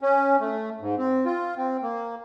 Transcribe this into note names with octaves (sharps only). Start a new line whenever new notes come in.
C#4
A3
G#2
C4
F4
C4
A#3